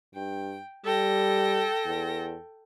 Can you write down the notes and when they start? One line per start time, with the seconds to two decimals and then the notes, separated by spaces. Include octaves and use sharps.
0.14 G2 G5
0.85 G3 A4 G5 A#6
1.86 E2